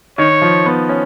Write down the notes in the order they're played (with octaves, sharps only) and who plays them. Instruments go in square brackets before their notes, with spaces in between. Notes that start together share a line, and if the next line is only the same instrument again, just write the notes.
[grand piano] D#3 [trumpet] C#5
[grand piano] F3
B3
C#4